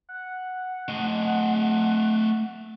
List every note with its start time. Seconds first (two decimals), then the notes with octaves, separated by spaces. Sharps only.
0.09 F#5
0.88 A3 D#5